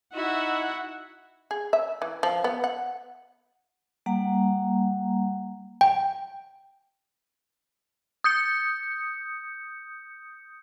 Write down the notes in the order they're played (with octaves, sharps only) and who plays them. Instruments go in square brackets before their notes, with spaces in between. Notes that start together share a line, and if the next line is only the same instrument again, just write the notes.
[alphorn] D#4 [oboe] E4 [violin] F#4 E5 [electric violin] F#5
[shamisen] G#4
E5
E3
F3
B3
F#5
[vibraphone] G3 A#3 F#5 A#5
[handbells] G5
[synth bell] D#6 G6 C#7